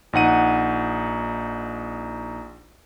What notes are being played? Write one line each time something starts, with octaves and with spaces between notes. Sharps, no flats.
A#1 D#4 F#5 D#7